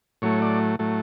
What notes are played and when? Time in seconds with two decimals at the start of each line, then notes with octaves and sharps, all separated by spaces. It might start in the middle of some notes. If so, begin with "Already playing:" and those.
0.22 A2 F#3 A3 C#5
0.42 D5
0.79 A2 F#3 A3